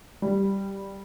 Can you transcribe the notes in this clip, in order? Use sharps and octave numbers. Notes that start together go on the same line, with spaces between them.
G3